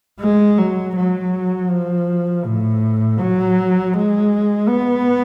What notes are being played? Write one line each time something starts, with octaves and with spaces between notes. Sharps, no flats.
G#3
F#3
F#3
F3
A2
F#3
G#3
B3